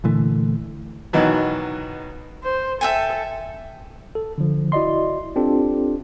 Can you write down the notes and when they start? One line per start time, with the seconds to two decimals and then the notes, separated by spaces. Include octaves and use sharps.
0.04 A#2 D3 E3 A3
1.13 B2 D#3 E3 F#3
2.43 C5
2.81 A4 E5 G5 G#5
4.15 A4
4.38 D3 F3
4.72 E4 F#4 D5 D#5 C6
5.36 C4 D4 F4 G4 A4